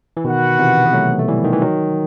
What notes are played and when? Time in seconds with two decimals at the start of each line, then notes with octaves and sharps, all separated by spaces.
0.17 E3
0.24 B2 D#3 F#4 B4 F#5
0.59 C3 E3
0.86 B3
0.93 F#3 A3
1.19 A3
1.28 E3 G3
1.44 D#3
1.53 E3
1.62 D#3 F#3